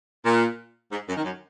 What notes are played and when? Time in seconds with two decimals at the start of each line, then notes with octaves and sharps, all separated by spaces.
0.25 A#2
0.92 G#2
1.09 F#2
1.16 D#3
1.25 F#2